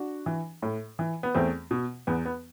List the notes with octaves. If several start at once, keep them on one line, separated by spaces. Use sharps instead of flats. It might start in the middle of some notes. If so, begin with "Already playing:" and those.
Already playing: D4 F#4
E3
A2
E3
B3
E2 A3 C4
B2
E2 B3
B3